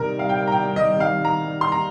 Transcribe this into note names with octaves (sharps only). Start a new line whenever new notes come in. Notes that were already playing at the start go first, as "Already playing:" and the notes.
Already playing: C3 D#3 G3 A#4
F5
G5
A#5
G5
D#5
F5
A#5
C6
A#5